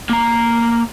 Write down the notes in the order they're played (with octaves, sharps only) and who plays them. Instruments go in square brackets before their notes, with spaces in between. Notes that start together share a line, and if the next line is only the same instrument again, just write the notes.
[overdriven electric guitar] A#3 A#5